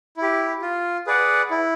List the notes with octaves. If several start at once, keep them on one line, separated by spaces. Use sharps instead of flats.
E4
G4
F4
G#4 B4 D5 F#5
E4